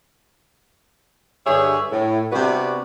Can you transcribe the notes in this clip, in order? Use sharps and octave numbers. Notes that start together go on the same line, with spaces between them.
G2 D3 G4 G#4 C#5 E5
A2
C3 G3 B3 D4 F#4 B4